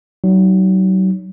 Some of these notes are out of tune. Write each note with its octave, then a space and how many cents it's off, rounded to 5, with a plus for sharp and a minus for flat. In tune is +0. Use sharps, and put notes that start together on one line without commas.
F#3 +35 D#4 +0